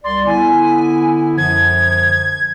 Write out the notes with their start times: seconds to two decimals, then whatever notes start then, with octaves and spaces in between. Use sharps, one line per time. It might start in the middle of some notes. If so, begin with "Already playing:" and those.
0.04 C2 D5 C6
0.26 D3 B3 E4 G#5
1.38 F#2 D3 F3 G#6